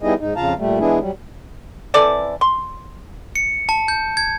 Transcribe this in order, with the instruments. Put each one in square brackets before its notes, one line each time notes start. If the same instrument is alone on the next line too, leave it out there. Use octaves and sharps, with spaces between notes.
[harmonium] G3 B3 D#4 E4 G#4 D#5
G#2 D#4
F2 C#3 F4 F5 A5 A#5
A#2 G3 A3
E3 G#3 B3 D4 E4 G#4
F#3 G3
[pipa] E3 C4 A4 D5
C6
[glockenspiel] C#7
A5
G6
G#6